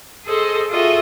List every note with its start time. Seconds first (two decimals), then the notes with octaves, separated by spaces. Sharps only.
0.24 G#4 A4 C5 D#5
0.70 F4 F#4 G#4 A4 D#5 E5